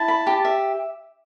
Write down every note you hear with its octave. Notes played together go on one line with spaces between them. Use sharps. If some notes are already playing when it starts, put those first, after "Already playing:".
Already playing: E4 A5
B5
G4
E5